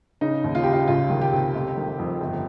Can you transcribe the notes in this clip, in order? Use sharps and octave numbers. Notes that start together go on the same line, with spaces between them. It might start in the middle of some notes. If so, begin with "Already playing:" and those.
C#3 D#4
D#2
F4
C#3 G4
F4
C#2 F4
D#3
G4
C3
F1
D#3
F2
G1